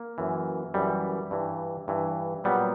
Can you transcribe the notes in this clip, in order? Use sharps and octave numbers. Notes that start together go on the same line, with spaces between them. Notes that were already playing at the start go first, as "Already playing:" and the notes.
Already playing: A#3
F#2 E3
F#2 E3 G3
G2 E3
G2 E3
A#2 F#3 G3 B3